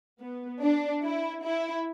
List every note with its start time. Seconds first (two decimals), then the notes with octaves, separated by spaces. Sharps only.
0.21 B3
0.63 D4
1.04 E4
1.45 E4